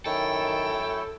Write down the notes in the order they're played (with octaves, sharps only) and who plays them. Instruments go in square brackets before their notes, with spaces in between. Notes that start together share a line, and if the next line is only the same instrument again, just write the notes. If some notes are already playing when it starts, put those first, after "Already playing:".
[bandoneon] F#2 E4 C#5 [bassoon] D#3 [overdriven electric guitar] A4 [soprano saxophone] G5